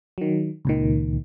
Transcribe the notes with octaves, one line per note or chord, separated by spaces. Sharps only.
D#3 F#3
C#2 A#2 D#3